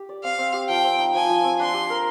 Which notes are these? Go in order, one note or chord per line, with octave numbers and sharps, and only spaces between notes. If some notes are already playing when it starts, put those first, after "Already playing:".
Already playing: G4
D5
C4 F5
C4
G4
F3 G5
C4
D#4
F3 G#5
F3
C4
D4 C6
G4
A#4